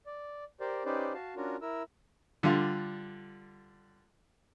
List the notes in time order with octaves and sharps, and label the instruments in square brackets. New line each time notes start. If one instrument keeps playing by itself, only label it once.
[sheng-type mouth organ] D5
G4 A#4 C5 D5
C#4 D#4 G4 B4 C5 D5
F#4 F5 A5
C#4 D4 F4 F#4 A#4
E4 A#4 E6
[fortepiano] D3 G3 F4